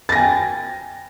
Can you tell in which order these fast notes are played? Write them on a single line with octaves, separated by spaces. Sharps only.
A6 A#6 G#5 G5